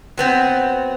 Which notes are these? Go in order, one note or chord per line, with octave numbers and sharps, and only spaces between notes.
F#3 B3 C4